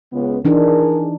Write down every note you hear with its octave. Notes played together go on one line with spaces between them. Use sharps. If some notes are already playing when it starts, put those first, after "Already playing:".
C#2 B3
E3 D4 D#4 G#4 A#4